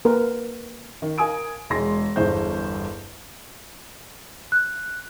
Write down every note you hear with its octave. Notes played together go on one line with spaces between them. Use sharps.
A#3 A#4 B4
D#3
A#4 F5 G#5 D#6 D7
E1 G#3 C6 A#6
G1 E2 G2 G#4 C5 G6
F#6